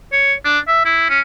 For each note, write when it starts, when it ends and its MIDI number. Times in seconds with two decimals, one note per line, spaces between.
0.12 0.33 73
0.45 0.59 62
0.67 0.84 76
0.85 1.05 64
1.09 1.20 61